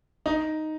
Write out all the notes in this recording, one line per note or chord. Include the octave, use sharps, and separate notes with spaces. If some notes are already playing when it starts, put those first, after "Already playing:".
D#4